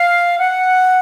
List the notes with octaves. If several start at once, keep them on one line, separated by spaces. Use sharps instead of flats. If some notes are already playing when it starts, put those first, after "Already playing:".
Already playing: F5
F#5